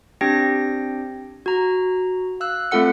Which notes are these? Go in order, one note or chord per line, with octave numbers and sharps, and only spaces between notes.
C4 D4 G4 G5 A#6
F#4 A#5
F5 E6 F#6
A3 C4 F4 A4 F#5 C#7